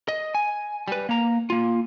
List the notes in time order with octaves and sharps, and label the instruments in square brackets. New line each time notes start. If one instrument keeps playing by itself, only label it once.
[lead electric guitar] D#5
G#5
G3 B4
A#3 A#5
A#3 F4